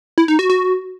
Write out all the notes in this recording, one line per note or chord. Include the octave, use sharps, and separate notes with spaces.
E4
D#4
F#4
F#4